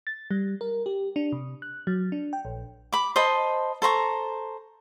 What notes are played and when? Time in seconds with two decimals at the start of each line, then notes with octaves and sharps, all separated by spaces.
0.07 A6
0.31 G3
0.61 A#4
0.86 G4
1.16 D4
1.32 C3
1.62 F#6
1.87 F#3
2.12 D4
2.33 G5
2.45 A#1
2.92 B5 D6
3.16 C5 D#5 A5 B5
3.82 A4 C5 A#5 C#6